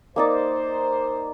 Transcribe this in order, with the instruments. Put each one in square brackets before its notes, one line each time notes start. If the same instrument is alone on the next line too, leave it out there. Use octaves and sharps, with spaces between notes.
[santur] A#3 D#4 D5 [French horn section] C5